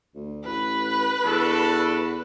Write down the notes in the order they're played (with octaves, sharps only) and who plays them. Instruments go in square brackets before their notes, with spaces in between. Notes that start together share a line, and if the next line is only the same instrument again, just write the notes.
[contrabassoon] D2
[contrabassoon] A1 [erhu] B4
[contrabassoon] E2 [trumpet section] D4 F#4 A4